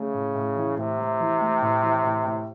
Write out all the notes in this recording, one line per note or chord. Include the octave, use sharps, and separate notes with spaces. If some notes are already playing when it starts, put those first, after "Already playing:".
Already playing: C#3 A3
A2
A2
E3
A2 C3
A3
E3
A3
A2
E3
A2
A2